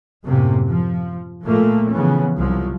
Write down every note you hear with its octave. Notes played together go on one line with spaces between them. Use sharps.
F#2 A2 C3 A#3
F3
A#2 F3 A3 A#3
C#3 E3 F3 B3 C#4
C2 F3 F#3